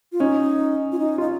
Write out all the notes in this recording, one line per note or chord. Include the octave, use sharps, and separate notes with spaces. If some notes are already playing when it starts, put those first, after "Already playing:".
F4
C#4 D#4
F4
D#4
D#4 F4